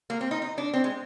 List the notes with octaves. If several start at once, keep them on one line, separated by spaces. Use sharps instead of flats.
A#3
C4
D#4
D#4
D4
C4
G#3